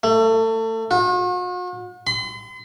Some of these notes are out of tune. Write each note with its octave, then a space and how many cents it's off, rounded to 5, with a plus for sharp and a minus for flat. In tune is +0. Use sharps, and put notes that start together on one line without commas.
A3 +30
F#4 -45
C6 -45